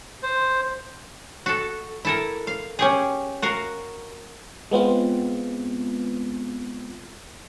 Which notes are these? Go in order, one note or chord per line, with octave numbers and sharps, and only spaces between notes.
C5
F#4 A4
E4 A4 A#4
F5
C#4 G4 G#4
F#4 A#4 F5
G#3 B3 C4 F4